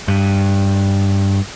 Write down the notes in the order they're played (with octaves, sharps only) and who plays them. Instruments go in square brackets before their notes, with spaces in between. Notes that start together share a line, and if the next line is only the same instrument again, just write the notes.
[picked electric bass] G2